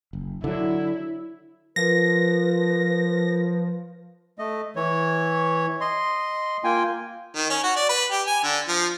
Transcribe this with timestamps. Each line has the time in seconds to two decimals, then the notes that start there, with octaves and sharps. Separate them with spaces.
0.13 F#1
0.44 D3 F#3 E4
1.76 F3 F4 A#4 B4 A#6
4.39 A3 D#5
4.76 E3 C#5
5.80 D#5 C6
6.64 A#3 F4 G5 G#5
7.35 D#3
7.50 C#4
7.64 F#4
7.76 D5
7.89 B4
8.11 G4
8.27 G#5
8.43 D3
8.68 F3